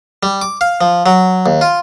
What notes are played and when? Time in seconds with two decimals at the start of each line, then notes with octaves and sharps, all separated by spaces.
0.23 G3
0.42 D6
0.61 F5
0.81 F3
1.06 F#3
1.46 D#2
1.61 F4